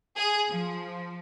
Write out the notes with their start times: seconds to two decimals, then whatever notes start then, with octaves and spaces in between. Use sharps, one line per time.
0.16 G#4
0.49 F3